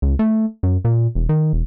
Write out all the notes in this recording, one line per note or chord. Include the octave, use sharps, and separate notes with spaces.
C#2
A3
F#2
A#2
E1
D#3
E1